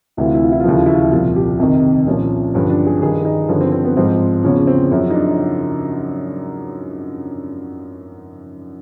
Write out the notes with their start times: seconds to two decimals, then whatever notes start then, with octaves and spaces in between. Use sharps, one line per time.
0.17 D2 C3 E3 E4
0.25 F4
0.34 E4
0.43 F4
0.52 E4
0.60 F4
0.64 D#2 C#3 F3 E4
0.77 F4
0.86 E4
0.94 F4
1.03 E4
1.12 C2 A#2 F3 F4
1.36 G4
1.59 F2 C3 D#3
2.06 C2 A#2 F3 C#4
2.54 G2 D3 F3 C#4
2.70 D4
2.86 G#4
3.02 G2 D#3 G#4
3.25 D#4
3.49 G2 D3 F3 C#4
3.61 C4
3.72 C4
3.84 B3
3.97 G#2 F3 C4
4.44 E2 C#3 F3 C#4
4.67 C4
4.91 F#2 C#3 F3 C#4
5.10 D#4
5.15 D4